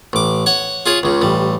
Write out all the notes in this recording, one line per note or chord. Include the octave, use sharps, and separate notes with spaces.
A1 D6
C#5 F#5
F4 G#4 C#5
C#2 C#3
A1 G3